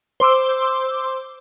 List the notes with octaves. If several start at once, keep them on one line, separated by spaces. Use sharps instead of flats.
C5 C6 D6 E6